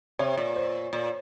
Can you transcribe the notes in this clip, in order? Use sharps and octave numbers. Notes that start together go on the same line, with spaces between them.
C3 C#5
A#2
C5
A#2